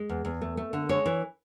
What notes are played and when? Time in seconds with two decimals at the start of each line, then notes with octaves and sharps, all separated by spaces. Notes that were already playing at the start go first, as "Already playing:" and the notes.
Already playing: G#3
0.09 E2
0.25 E2
0.41 A3
0.57 A3
0.73 D3
0.89 G#3 C#5
1.06 E3